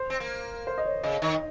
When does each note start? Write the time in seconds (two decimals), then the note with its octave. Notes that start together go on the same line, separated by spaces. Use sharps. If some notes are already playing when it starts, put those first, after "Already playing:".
Already playing: C5
0.10 C4
0.20 A#3
0.67 C5
0.78 D#5
0.86 C#5
1.04 C#3 D#5
1.22 D#3